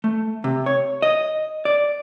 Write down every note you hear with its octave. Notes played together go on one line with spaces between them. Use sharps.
A3
C3
C#5
D#5
D5